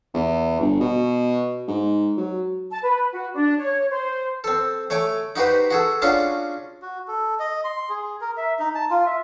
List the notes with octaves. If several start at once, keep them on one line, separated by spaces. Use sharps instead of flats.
E2
G1
B2
G#2
F#3
A5
B4
F#4
D4
C#5
C5
C4 A4
A3 C#5 G#5 D6
D#4 F#4 G4 B4 C5
F#4 G#4 A4
C#4 D4 F4 F#4 G#4
F#4
A4
D#5
C6
G#4
A#4
E5
D#4
A5
F4
E5